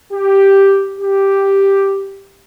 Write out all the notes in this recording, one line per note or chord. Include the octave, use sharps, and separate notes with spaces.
G4
G4